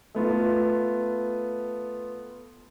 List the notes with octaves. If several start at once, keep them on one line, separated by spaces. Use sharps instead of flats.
A3 B3 F4